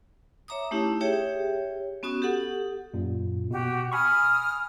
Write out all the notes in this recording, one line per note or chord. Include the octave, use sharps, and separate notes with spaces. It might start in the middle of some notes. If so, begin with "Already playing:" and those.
C#5 E5 A#5 D6 D#6
A3 C#4 D#4 E4 G4
G4 G#4 C#5 E5 G5
B3 C#4 F#4 D#6
G4 A4 F#5
F#2 A#2
B2 F#4 G4
G#5 B5 C#6 D#6 F6